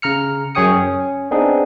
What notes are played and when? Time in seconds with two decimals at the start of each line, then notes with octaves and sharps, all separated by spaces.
0.02 C#3 A#5 F6 C#7
0.55 F#2 G#4 C#5 G5 D#6 C#7
0.72 C#4
1.31 B3 C4 D4 D#4 G#4